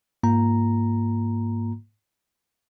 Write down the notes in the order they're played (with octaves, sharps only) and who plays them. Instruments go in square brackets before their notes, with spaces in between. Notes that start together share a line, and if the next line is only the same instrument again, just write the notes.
[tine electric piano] G#2 A#3 F4 A#5